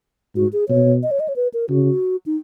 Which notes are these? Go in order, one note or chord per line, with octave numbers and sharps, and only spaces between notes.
G#2 F#4
G#4
B2 C#5
D#5
C#5
D#5
C#5
B4
A#4
C#3 F#4
D#4